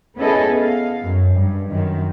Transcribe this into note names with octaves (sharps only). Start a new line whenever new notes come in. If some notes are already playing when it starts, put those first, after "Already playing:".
B3 C#4 E4 G#4 A4 D#5
F5
F#2
G2
F#2 D#3